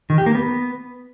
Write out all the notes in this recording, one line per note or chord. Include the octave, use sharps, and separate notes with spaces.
D#3
G4
A#3
B3